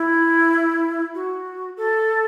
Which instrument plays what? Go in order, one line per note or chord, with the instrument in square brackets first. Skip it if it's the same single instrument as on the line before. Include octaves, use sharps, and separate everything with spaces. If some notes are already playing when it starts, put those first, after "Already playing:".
Already playing: [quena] E4
F#4
A4